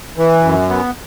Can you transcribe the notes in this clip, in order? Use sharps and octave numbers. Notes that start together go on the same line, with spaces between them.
E3
F#2
B3